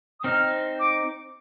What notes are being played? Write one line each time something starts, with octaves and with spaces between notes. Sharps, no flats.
D#6
C4 D#4 F6
D6